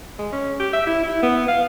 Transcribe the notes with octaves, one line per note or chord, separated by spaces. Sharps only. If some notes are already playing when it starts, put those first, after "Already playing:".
G#3
C#4
G4
E5
E4
E4
B3
F5